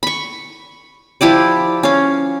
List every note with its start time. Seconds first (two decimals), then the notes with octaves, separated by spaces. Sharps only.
0.03 B5 C#6
1.21 F3 E4 G4 D5
1.83 C#4 F5